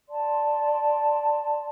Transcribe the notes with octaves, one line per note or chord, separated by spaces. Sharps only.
D5 A5 C6